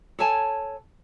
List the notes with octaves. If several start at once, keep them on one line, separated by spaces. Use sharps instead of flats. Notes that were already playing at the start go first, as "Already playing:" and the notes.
A4 C#5 G#5 A5